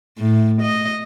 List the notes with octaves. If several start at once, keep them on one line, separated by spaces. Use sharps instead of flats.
A2
D#5